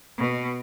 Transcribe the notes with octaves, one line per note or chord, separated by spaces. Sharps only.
B2